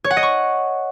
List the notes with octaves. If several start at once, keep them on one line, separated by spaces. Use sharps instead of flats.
C#5
F#5
D#5
C#6